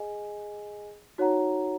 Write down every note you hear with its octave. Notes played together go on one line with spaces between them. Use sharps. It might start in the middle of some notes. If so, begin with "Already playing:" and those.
Already playing: G#4 D#5 G#5
D#4 F#4 C#5 F#5 A#5